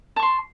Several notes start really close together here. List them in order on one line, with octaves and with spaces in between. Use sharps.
A5 C#6 C6